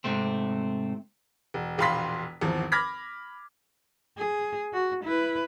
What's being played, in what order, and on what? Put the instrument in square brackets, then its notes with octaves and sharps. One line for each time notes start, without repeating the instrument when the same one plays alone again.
[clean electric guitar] G#2 C3 A3 C4
[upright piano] E1
E1 A#1 F5 B5 C6 B6
G#1 E2 F3
B5 D6 F6 G#6 A#6 B6
[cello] G#4
F#4
E4 B4